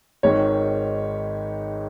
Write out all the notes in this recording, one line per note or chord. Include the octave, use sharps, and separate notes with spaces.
G#1 G#2 D#3 C#5